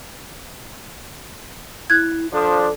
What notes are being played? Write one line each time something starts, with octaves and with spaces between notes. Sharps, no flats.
E4 F#6 G#6
F3 D4 A4